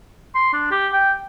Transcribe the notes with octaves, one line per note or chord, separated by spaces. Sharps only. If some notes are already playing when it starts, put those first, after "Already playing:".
C6
D4
G4
G5